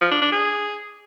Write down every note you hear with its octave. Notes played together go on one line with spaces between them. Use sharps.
F3
D4
D4
G#4